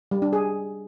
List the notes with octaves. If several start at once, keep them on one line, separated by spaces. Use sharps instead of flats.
G3
D4
G#4